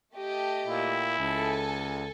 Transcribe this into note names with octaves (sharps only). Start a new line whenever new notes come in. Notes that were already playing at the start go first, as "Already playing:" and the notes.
A3 G4 D#5
A#2 E4
C#2 A4 G#5